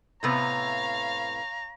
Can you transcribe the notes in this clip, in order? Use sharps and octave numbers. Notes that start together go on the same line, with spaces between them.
A2 C3 B3 C#5 F5 A#5